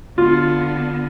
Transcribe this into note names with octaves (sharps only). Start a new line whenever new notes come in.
D3 B3 F4